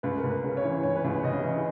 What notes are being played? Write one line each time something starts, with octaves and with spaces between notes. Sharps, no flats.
C#2 B4
A#4
C#2
B4
C#3
C#5
E3
C#2 C#5
B4
C#2 C#5
C#3 D#5
E3